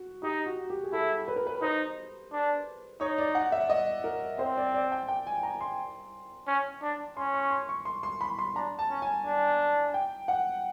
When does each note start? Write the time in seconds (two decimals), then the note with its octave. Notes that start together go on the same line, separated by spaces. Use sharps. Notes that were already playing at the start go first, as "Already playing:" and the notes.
Already playing: F#4
0.23 D#4 G4
0.46 F#4
0.70 G4
0.83 G#4
0.93 E4 A4
1.28 B4
1.36 A#4
1.47 B4
1.62 D#4 C5
2.32 D4
3.00 D#4 C#5
3.18 D5
3.35 F#5
3.52 E5
3.69 D#5
4.04 A#4
4.39 C4 C5
4.57 D5
4.74 D5
4.92 G5
5.08 G5
5.27 G#5
5.43 A#5
5.61 C6
6.47 C#4
6.82 D4
7.16 C#4 C6
7.34 C#6
7.51 C6
7.69 C#6
7.85 C6
8.03 C6
8.21 B5
8.39 C6
8.55 D4 A#5
8.79 A5
8.90 C#4
9.02 G#5
9.25 D4
9.94 G5
10.28 F#5